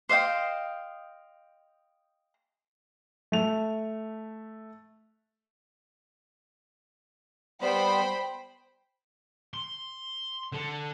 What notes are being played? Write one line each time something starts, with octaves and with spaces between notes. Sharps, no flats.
C5 D#5 F5 G5
A3 F7
G3 B3 C5 G5 B5
C6
D3 A4